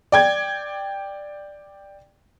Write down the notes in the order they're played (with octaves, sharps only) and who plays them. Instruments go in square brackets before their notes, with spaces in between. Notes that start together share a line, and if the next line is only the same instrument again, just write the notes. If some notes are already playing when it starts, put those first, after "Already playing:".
[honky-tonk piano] D5 G5 G#6